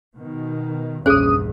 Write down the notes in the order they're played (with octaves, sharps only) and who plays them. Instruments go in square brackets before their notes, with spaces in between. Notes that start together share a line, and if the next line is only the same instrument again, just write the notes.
[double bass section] B2 D#3
[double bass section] A#1 E2 G2 [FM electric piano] C#4 D#6 [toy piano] G#4 C5